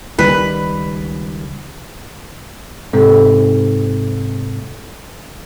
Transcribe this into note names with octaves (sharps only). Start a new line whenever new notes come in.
C#2 D#3 G3 B4
G#2 C3 A4